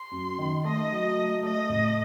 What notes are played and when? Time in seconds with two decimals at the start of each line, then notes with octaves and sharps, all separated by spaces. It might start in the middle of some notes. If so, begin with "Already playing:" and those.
Already playing: C6
0.11 F#2
0.38 D#3
0.64 A3 D#5
0.90 F#3
1.17 A3
1.43 A3 D#5
1.70 A2